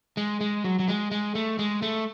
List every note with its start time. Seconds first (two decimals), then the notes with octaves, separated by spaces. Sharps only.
0.17 G#3
0.41 G#3
0.64 F#3
0.79 F#3
0.88 G#3
1.11 G#3
1.35 A3
1.59 G#3
1.82 A3